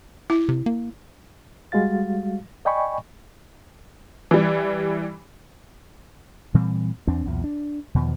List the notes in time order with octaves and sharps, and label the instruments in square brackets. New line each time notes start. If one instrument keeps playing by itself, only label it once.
[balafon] E4
[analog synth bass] C3
A#3
[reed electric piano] G3 G#3 F#4 F5 A6
D5 D#5 G5 G#5 B5 C#6
[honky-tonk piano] E3 G3
[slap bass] A#2 E3 G3 C4
E2 C4 D4
B1 E2 A#2
D4
E2 B2 D#3 F3